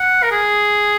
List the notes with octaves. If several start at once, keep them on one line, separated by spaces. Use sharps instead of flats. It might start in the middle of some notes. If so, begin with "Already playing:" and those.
Already playing: F#5
A#4
G#4